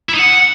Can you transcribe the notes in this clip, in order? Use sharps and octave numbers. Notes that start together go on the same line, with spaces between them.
E4
D#4
F#5